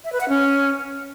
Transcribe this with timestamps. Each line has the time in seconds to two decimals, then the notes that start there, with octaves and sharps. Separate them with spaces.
0.05 E5
0.13 B4
0.21 F#5
0.29 C#4